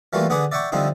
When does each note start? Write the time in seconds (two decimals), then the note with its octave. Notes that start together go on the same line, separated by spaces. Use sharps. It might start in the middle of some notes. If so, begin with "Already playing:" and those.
0.13 E3 G3 A3 A#3 F4 F#4
0.30 D3 B3 G#4 F#5 B5 D6
0.52 D5 E5 F#5 G5 C#6 D6
0.72 D3 F3 G3 C4 D#4 E4